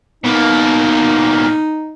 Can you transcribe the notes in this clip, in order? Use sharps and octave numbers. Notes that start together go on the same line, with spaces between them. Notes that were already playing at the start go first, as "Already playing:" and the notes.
B2 A#3 D#4